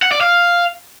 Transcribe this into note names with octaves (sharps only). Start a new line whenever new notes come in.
F#5
D5
F5